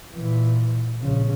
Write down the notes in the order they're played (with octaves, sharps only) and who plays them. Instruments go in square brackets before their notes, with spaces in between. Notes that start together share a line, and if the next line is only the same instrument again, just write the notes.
[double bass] A#2 E3
A#1 C#3